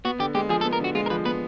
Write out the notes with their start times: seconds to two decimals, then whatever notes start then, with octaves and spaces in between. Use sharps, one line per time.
0.05 B3 F#4
0.19 D3 G4
0.34 G#3 G4
0.49 F3 G#4
0.61 A4
0.65 B3
0.73 A#4
0.80 D3 F#4
0.95 G#3 F4
1.06 A#4
1.10 F3 B4
1.25 B3 B4